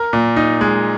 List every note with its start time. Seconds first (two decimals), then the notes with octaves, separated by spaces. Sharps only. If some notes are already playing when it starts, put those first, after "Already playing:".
Already playing: A#4
0.13 A#2
0.36 D#4
0.61 G#3